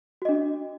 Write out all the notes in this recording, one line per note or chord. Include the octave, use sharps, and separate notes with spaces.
D4 F#4 D#5